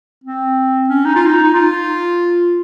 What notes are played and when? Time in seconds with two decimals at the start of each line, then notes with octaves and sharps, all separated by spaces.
0.24 C4
0.89 C#4
1.05 D#4
1.15 F4
1.26 D#4
1.43 D#4
1.54 F4